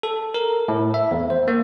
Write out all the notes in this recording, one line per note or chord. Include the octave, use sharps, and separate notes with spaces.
A4
A#4
A2
E5
E2
C5
A#3